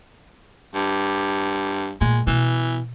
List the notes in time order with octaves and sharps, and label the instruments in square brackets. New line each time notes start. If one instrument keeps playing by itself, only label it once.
[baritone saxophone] G2
[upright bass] A#2 [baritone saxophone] G#3
[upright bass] B2 [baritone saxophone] E3